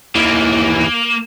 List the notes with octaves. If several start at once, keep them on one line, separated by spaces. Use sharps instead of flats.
D#2 E3 A#3